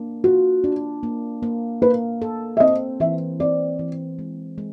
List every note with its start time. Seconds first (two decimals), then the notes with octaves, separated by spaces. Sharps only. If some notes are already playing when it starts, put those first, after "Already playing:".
Already playing: A#3 D4
0.24 F4 F#4
0.64 D4
1.03 A#3
1.43 A#3
1.82 A#3 B4
2.22 A4
2.57 E5
2.60 C4 D#5
3.00 E3 E5
3.40 C4 D5
3.79 E3
4.19 G#3
4.58 G#3